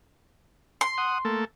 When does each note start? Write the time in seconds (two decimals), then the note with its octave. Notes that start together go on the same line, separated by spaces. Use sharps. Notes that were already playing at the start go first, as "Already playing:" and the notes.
0.81 C6
0.98 F#5 D#6
1.25 A3 A#3 A4